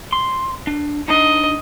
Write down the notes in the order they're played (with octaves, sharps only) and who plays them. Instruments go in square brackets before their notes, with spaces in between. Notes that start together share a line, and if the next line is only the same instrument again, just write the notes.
[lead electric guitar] C6
D4
[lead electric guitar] D4 D#4 [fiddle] D#5